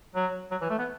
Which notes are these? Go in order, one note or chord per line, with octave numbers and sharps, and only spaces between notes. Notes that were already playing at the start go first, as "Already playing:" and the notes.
F#3
F#3
E3
A3
B3